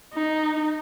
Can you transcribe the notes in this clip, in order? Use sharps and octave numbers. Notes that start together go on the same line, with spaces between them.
D#4